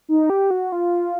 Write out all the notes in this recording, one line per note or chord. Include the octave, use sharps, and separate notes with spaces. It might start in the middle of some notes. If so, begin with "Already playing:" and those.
D#4
G4
F#4
F4